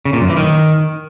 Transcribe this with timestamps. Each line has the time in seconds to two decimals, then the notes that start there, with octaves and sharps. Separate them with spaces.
0.05 C#3
0.13 A#2
0.21 F#2
0.29 E3
0.37 D#3